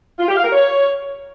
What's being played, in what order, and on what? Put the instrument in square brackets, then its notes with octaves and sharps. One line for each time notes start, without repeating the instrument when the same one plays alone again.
[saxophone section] F4
G4
F5
A#4
C#5